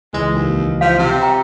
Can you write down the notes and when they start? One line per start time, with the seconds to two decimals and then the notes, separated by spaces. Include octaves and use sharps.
0.13 C#2 E3 G#3 D#5
0.33 D#2
0.81 F3 F5
0.98 C3
1.22 G5 A#5